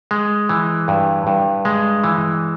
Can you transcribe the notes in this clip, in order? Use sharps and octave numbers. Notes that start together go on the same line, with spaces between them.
G#3
E3
G2
G2
G#3
E3